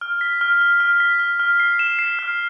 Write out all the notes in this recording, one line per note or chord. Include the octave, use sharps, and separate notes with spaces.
F6
B6
F6
F6
F6
B6
F6
F6
C7
E7
C7
F6